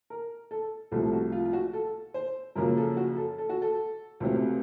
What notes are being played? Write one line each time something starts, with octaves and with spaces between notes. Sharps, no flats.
A#4
A4
C2 C3 F3 A3 A4
A4
F#4
F4
F4
F#4
A4
C5
F#2 C#3 F3 A#3 A#4
A4
F#4
A4
A4
F#4
A4
C#2 C3 F#3 A3 C4